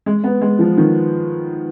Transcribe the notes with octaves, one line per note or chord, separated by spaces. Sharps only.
G#3
B3
G#3
F3
D#3